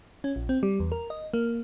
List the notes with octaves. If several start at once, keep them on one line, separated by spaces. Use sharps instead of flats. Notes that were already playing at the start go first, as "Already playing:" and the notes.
C#4
A#1
C4
G3
E2
A#4
D#5
A#3